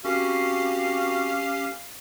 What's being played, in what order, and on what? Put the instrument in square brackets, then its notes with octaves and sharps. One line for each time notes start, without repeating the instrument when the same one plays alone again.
[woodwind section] A#3 C4 F#4 [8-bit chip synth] C#4 G4 C7 [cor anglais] F5